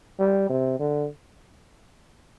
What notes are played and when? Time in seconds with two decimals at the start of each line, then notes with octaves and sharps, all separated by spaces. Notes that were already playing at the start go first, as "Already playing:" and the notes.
0.19 G3
0.49 C3
0.79 D3